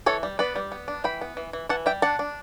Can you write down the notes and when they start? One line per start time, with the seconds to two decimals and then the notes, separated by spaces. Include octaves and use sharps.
0.06 E3 A4 C#5
0.23 G3
0.39 B3 B4 D5
0.56 G3
0.72 B3
0.88 D4
1.04 E3 G5 B5
1.21 B3
1.37 E3
1.53 E3
1.69 E3 F#5 A5
1.86 G3 E5 G5
2.02 D4 F#5 A5
2.19 D4